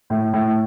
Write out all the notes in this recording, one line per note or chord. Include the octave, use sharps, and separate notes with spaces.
A2
A2